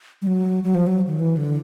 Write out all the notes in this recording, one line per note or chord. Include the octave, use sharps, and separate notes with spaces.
G3
F#3
F#3
F3
F#3
D#3
E3
D3